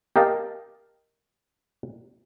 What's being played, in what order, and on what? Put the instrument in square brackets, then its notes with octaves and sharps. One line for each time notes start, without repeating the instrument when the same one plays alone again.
[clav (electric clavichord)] G4 A#4 D#5 F5 G5 A5